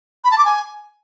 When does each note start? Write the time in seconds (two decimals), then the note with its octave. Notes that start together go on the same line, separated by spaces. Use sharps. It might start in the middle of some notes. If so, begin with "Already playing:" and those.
0.24 B5
0.31 A5
0.38 D6
0.45 G#5